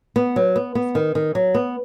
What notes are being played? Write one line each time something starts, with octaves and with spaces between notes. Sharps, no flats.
B3
F#3
B3
B3
D#3
D#3
F#3
B3